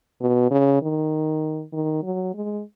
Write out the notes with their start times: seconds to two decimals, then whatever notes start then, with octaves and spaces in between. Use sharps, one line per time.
0.21 B2
0.51 C#3
0.82 D#3
1.73 D#3
2.03 F#3
2.34 G#3